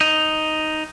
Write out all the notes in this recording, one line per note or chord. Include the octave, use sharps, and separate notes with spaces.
D#4